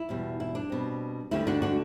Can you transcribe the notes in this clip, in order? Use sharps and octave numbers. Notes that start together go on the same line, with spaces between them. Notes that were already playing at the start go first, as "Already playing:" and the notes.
Already playing: E4
E2 B2 G3
E4
D4
B2 G3 C4
D2 D3 G3 E4
D4 F#4
D4 F#4